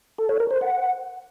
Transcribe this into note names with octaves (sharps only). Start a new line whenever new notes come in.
A4
C#5
A#4
C5
F#5